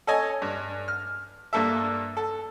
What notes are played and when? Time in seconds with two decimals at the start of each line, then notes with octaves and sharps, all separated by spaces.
0.07 A4 C#5 D#5 G#5
0.42 G2
0.88 F6
1.53 G2 A#3 A4 E5
2.17 A4